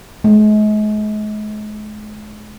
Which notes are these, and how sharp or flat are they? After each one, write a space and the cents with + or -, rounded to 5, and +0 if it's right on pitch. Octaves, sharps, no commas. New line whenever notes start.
G#3 +40